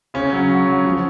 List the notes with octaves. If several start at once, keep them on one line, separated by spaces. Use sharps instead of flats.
C#3 C#4
F#3
F#3
F#3
F3